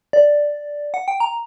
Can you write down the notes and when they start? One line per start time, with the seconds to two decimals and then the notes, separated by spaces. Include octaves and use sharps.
0.13 D5
0.94 F#5
1.08 G5
1.20 A#5